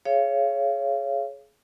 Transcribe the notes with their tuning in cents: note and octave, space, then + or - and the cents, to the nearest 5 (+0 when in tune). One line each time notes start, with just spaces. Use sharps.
G#4 +30 C#5 +0 F5 -30